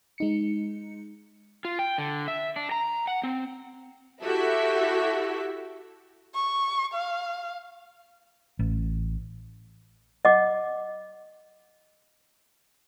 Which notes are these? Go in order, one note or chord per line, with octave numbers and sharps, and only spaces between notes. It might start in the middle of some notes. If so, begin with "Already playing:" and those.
G#3 D#4 C#7
F4
G5
D3
E5
D4
A#5
F#5
C4
E4 F#4 G4 A4 E5
C#6
F5
A1
D#5 F#5 D6